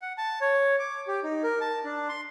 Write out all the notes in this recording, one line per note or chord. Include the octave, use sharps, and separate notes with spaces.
F#5
A5
C#5
D6
G4
D#4
A#4
A5
D4
C6